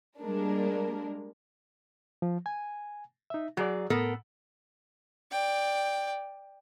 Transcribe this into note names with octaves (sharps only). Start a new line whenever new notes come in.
G3 G#3 A#3 D4 A#4
F3
G#5
D#4 E5
F#3 F#4 G#4 D5
A2 B3 A4 A#4
D5 G5